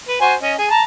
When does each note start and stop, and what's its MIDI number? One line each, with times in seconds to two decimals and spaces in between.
0.08 0.17 71
0.21 0.34 66
0.21 0.34 72
0.21 0.34 80
0.42 0.55 61
0.42 0.55 75
0.58 0.69 68
0.71 0.83 81
0.71 0.83 82